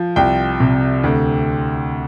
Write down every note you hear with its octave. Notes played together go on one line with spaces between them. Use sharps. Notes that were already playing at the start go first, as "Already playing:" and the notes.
Already playing: F3
C2 G5
C3
D2